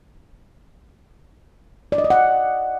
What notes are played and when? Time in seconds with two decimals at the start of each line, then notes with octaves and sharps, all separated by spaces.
1.92 D5
1.98 D#5
2.04 D5
2.10 F#5